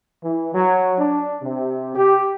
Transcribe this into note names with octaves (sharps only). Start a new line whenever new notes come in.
E3
F#3
D4
C3
G4